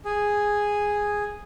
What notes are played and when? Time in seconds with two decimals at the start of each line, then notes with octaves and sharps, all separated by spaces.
0.05 G#4